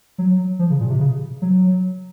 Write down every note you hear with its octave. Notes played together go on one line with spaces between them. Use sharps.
F#3
F3
C#3
A#2
C3
C#3
F#3